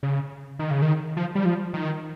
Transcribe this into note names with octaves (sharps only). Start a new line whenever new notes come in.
C#3
D#3
C#3
D#3
F3
G3
F3
D#3